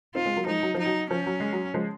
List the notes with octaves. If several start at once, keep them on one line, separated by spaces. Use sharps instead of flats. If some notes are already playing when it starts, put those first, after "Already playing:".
C4 D#4 F4
G#3 C4
F#3 A#3
F3 G#3 D#4
F#3
F3 D#4
F#3
F3 C#4
F#3
G#3
F#3
F3 G#3